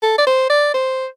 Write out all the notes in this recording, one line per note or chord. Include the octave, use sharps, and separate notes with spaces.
A4
D5
C5
D5
C5